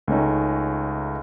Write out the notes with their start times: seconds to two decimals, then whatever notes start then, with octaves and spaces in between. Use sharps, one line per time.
0.08 C#2 A3 C#4 D#4